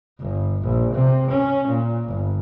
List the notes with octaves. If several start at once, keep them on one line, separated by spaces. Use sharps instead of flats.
G1
A#1
C3
C#4
A#2
G1